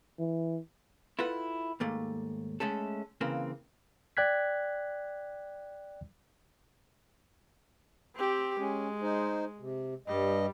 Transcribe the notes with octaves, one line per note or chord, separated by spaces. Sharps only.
E3
E4 F4 A4 B4 F#5
D#2 G#2 A3 A#3
G#3 A3 C#4 A4
C#3 E3 A#3 C4
D5 G5 F#6 G#6 B6
C4 G4
G#3 C#4
D#4 C5
C3
G2 G3 D#5